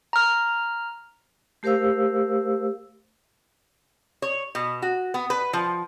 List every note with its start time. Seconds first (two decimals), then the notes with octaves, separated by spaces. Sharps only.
0.13 A#5 F6
1.63 A3 G4 A#4 C5 F5 E6
4.22 C#5
4.55 B2
4.82 F#4
5.14 B3
5.30 B4
5.53 F3